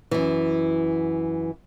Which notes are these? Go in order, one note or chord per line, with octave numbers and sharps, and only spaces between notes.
F#2 E3